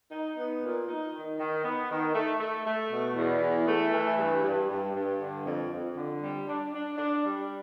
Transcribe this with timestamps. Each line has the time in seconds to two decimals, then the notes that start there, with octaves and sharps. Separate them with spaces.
0.11 D#4
0.37 B3
0.62 A#2
0.88 D#4
1.13 D#3
1.39 D#3
1.64 B3
1.90 D#3
2.15 A3
2.40 A3
2.66 A3
2.91 B2
3.16 E2
3.42 E3
3.68 A3
3.93 E3
4.18 G2
4.43 G2
4.69 G2
4.95 G2
5.20 D3
5.46 F2
5.72 F2
5.96 D3
6.22 G3
6.48 D4
6.73 D4
6.98 D4
7.24 G3